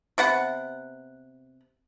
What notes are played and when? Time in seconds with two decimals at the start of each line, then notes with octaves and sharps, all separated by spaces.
0.18 C3 B3 F#5